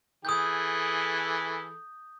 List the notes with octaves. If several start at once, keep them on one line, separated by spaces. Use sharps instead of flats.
E3 G#4 A4 D#6 G6